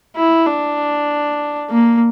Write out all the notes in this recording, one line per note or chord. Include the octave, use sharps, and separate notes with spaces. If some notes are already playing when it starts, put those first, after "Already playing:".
E4
D4
A#3